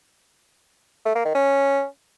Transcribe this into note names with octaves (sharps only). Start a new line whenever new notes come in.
A3
A#3
D#3
C#4